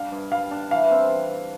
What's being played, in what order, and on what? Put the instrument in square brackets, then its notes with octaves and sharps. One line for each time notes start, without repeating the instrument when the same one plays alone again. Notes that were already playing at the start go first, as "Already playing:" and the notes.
Already playing: [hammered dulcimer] G3 D4 [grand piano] F5
[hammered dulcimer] G2
[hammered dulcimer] G3 [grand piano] F5
[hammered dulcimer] D4
[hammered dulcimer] E3 [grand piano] F5
[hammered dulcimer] C4